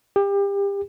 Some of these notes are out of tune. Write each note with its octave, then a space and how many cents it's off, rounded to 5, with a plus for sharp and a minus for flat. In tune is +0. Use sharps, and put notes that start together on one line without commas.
G4 +30